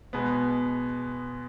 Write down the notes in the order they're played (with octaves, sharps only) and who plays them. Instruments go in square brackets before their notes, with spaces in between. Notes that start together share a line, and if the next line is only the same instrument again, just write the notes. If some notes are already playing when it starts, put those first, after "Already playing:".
[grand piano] B2 G#3 B3